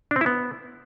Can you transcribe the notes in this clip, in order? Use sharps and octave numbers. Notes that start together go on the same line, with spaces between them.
D4
C4
E4
B3